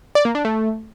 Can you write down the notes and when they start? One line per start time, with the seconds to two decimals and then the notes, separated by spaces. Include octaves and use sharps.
0.15 D5
0.25 A#3
0.35 D4
0.45 A3